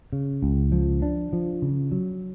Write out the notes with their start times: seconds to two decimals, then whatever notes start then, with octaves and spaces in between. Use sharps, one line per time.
0.13 C#3
0.43 C#2
0.72 F3
1.02 D4
1.33 F3
1.62 C#3
1.92 F#3